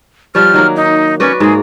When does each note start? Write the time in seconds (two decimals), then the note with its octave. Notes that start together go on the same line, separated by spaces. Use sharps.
0.35 F3 G3 C#5 F6
0.54 D#3 F#3 A#3
0.76 D#4
1.20 C#4 F#4 B4 D5
1.40 G#2 A#3 G#4